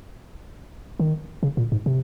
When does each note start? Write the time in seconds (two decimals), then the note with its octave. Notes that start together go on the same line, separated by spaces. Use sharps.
1.00 D#3
1.43 C#3
1.57 A#2
1.72 G#2
1.86 C3